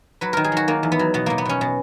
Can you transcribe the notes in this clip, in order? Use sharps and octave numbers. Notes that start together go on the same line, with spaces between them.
F#3 B4
D#3 A#4
G#4
F#3 F#4
D#3 A#3
E2
B3
F#3
B2 B3
B2 A#3
B3
B2 C#4
B2